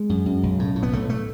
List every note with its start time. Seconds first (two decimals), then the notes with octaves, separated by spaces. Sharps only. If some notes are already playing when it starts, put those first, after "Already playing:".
Already playing: G#3
0.09 F#2
0.26 F#2
0.43 B1
0.59 A2
0.75 A2
0.83 B3
0.93 B1 A3
1.10 A3